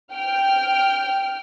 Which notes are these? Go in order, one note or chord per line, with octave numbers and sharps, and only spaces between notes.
G5 F6